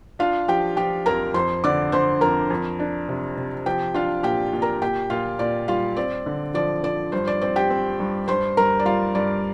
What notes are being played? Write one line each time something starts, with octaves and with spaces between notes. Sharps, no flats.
D4 F4 F5
F3 G4 G5
F3 G4 G5
F2 A#4 A#5
F2 C5 C6
D3 D5 D6
D3 C5 C6
F2 A#4 A#5
F2
D4
C3
C3
F3 G4 G5
D4 F4 F5
A#2 G4 G5
A#2
A#4 A#5
A#2 G4 G5
A#2 F4 F5
A#2 D5
G3 F4 F5
C4 D5
D3
F3 D5
F3 D5
G2 C5
D5
C4 D5
G4 G5
C4
G2
G2 C5 C6
G2 A#4 A#5
D5
G3 F4 F5
G2 D5